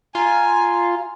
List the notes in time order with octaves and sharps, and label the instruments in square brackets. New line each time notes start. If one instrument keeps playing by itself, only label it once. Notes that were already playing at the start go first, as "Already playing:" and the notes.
[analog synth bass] F4 [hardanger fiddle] G#5 [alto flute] A#5